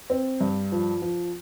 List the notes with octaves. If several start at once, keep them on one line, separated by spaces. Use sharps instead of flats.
C4
G2
F3
F3